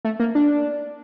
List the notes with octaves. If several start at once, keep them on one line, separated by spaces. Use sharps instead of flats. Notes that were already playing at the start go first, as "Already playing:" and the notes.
A3
A#3
D4